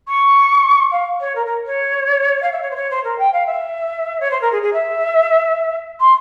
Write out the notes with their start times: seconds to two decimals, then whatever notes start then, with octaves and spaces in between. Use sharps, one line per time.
0.08 C#6
0.92 F5
1.20 C#5
1.35 A#4
1.46 A#4
1.66 C#5
2.42 F5
2.52 E5
2.61 C#5
2.70 C5
2.75 C#5
2.90 C5
3.04 A#4
3.18 G5
3.33 F5
3.46 E5
4.20 C#5
4.30 C5
4.41 A#4
4.52 G#4
4.62 G#4
4.73 E5
6.00 C6